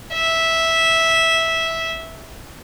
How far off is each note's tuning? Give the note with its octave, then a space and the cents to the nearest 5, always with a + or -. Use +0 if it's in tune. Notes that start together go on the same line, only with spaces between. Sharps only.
E5 -10